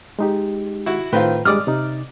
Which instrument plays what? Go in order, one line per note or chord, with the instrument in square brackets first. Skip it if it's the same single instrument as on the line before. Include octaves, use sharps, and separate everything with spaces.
[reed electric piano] G#3 D#4 G4
[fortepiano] E4 F#4
[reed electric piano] A2 B4 [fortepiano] D#3 C4 F4
[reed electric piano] G2 G3 G#3 [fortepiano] D5 D#6 F6
[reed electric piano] C3 D#4